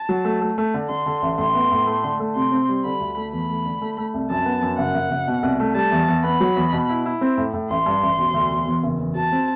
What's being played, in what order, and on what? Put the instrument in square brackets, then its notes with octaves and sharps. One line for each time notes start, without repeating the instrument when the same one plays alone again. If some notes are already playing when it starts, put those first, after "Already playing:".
Already playing: [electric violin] A5
[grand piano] F#3
A3
A3
A3
D3
[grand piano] D3 [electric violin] C6
[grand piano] D3
A1
[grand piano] A2 [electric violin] C6
[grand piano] B3
A2
A3
D3
A3
[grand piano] C3 [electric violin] C6
[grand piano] C4
G3
[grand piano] D3 [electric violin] B5
[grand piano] D2
A3
[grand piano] E2 [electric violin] B5
[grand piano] A3
D3
A3
A3
C2
[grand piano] F#2 [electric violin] A5
[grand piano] B3
F#2
[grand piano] F#1 [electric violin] F#5
[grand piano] F#1
F#1
B2
C2
A3
[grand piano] G3 [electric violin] A5
[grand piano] E2
E2
[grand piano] B3 [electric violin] B5
[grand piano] F#3
E2
B2
E4
E4
C4
A2
A2
[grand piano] A1 [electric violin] C6
[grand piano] G2
A1
E1
D2
E1
E2
F#1
E2
[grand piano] F#4 [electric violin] A5
[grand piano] C4